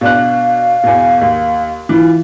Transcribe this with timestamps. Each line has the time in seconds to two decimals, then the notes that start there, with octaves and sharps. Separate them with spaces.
0.01 B2 D4 F5 F#6
0.83 E2 B2
1.21 D#2
1.89 E3 F4